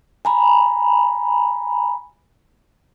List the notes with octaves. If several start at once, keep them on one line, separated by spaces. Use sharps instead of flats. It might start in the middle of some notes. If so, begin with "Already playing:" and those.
G#5 A#5 B5